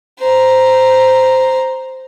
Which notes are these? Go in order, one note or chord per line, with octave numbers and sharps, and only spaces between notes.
C5 A#5